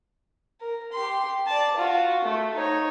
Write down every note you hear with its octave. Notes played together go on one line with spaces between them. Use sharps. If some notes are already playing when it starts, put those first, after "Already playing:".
A#4
G4 C6
D5 A5
F4 F#4
A3
D#4 C#5